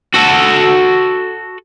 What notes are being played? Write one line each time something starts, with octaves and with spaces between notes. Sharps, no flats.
F#4 A4